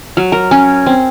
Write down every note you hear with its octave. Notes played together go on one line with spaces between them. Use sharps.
F#3
A#4
C#4
C4